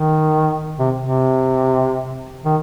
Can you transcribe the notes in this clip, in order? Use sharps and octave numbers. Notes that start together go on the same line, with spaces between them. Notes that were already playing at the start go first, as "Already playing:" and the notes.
Already playing: D#3
C3
C3
D#3